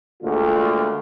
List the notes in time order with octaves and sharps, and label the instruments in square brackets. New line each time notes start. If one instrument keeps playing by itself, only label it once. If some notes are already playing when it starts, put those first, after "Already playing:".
[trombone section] D2 A#2 D3 G#3 F4